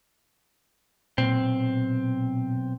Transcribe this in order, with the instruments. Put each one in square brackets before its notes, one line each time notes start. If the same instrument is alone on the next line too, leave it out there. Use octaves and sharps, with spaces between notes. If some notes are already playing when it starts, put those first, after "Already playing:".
[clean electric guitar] B1 C4 [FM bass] A#2